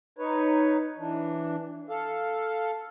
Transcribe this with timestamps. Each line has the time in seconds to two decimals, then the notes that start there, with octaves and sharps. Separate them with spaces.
0.19 D#4 B4 C#5
0.98 E3 D4
1.90 A4 F5